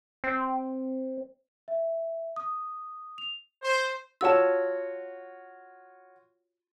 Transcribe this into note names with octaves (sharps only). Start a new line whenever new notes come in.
C4
E5
D#6
F7
C5
F4 F#4 C#5 A5 E6